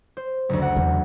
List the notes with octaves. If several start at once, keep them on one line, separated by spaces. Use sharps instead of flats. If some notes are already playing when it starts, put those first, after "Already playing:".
C5
F#1 D2
F#5
E2